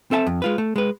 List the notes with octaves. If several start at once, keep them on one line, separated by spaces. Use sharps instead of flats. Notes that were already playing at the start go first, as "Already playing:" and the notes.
C4 A4 E5 G#5 A5
F2
G#3 F4 B4
A3
G#3 B4